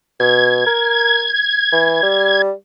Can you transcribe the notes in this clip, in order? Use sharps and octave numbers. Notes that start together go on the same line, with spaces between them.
B2 G#6
A#4
E3
G3